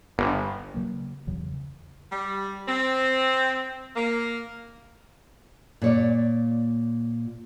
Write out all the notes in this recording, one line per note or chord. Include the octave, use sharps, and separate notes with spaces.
G1
C#3 F#3 A#3
E2 C#3 F#3
G3
C4
A#3
A#2 C#5 D5